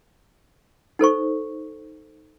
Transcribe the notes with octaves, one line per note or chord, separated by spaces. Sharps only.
D#4 A4 C5 C#6